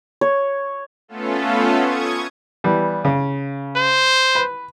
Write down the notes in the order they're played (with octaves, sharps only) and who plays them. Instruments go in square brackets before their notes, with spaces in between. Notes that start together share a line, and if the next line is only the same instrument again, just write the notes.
[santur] C#5
[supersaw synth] A3 B3 C#4 F4 A4
C#6 D#6 G#6
[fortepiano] E3 G3 B3
C#3
[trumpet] C5
[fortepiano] B4